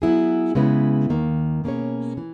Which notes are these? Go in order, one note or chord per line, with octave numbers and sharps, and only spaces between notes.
F#3 B3 E4 G#4
C#3 G#3 B3 E4 B4
D#2 D#3 A#3
B2 A#3 C#4 G#4 C#5
E3